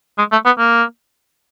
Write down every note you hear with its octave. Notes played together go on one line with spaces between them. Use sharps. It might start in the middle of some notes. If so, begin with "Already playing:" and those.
G#3
A3
B3
A#3